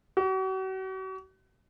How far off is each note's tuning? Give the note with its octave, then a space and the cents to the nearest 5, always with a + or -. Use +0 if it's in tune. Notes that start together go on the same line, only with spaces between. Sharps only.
F#4 +40